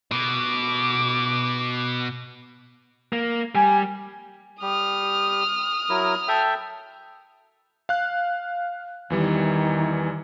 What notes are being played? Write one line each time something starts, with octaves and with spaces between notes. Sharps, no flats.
B2 D6
A#3
G3 G#5
G3 G4 D#6 F6
F#3 E4 A#4
A4 E5 G5
F5 F#6
E2 D#3 E3 G3